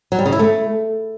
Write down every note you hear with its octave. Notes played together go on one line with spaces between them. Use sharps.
F#3
G3
C#3
E4
A3